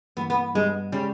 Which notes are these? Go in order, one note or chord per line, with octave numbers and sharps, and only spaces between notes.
G2 E3 A#3 B3
B3
G2 G3 G#3 B3
C#3 G3 G#3 C#4 G#4 C#5